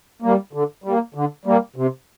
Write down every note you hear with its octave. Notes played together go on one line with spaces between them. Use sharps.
G3 A#3
D3
G3 A#3
D3
G3 A#3
C3